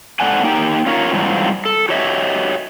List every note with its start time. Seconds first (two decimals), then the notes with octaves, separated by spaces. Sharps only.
0.20 G#2 C4 A4 D5 F#5 G#5
0.43 A#3 D#4 G4 A#4 G5
0.86 C#4 F4 A#4 C#5
1.13 G#2 E3 F#3 G3 C4 F4
1.65 A4
1.89 F#4 G4 C#5 D#5 E5